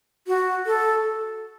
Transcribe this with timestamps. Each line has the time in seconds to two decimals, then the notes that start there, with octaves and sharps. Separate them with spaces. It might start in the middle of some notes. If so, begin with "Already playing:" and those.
0.27 F#4
0.66 A4